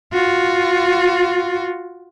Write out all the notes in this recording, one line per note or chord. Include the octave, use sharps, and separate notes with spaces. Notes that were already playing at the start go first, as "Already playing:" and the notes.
F4 F#4